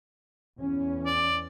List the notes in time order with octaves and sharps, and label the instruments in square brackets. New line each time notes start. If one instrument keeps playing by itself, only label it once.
[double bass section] E2 C#4
[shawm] D5